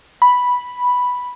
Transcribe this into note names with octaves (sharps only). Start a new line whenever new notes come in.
B5